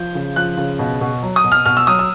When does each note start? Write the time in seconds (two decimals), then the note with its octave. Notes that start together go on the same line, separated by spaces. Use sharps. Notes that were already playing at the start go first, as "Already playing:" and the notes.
Already playing: F3 G6
0.15 C#3
0.36 F3 F#6
0.57 C#3
0.79 B2
1.01 B2
1.22 F#3
1.36 D#6
1.44 B2
1.52 F6
1.65 B2 F6
1.77 E6
1.87 F#3 D#6
1.99 E6